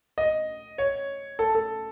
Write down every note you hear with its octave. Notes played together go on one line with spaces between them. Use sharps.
D#5
C#5
A4
A4